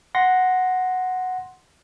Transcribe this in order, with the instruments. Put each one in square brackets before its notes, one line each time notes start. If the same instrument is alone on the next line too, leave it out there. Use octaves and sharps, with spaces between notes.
[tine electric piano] F#5 C6 A#6